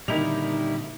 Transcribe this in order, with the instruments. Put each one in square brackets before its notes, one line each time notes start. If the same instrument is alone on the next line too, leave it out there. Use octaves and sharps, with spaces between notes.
[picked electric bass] A#2 D3 [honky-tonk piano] D#3 D#4 F7 [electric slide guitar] G3 E4